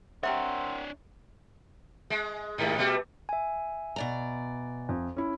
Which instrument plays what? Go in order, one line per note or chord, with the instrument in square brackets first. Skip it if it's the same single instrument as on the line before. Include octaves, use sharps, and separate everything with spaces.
[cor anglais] C4 [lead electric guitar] D4 C#5 [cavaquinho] G4 A#4 F#5 [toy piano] E5
[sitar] G#3
D#2 G#2
B2 G3 A3
[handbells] E5 G#5
[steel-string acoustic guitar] B2 D5 A#5
[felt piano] F2
C#4 E4